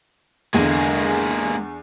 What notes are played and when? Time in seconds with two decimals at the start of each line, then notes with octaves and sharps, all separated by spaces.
0.54 E2 D3 G#3 A#3